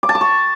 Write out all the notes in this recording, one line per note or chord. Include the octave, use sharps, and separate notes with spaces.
D6
A5
D6
C#6